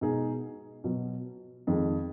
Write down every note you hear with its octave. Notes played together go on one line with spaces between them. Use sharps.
B2 G#3 D#4 G#4
B2 F#3 B3
F2 D#3 G#3